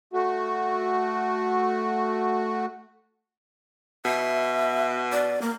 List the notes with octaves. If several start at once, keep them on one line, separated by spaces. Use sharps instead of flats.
A3 F#4
B2 E5
D5
A#3